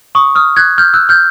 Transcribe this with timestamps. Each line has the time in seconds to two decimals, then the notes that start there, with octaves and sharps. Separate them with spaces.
0.15 C#6 D#6
0.35 D#6 F6
0.57 F#6 G#6
0.78 F6 G6
0.94 E6 F#6
1.09 F6 G6